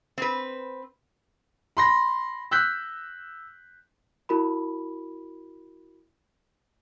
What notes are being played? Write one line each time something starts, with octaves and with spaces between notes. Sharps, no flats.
C4 B4
B5 C6 A#6
E6 F#6 G6 B6
E4 F#4 A#4 B5